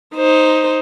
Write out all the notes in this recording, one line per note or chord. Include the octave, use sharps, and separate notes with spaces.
D#4 C5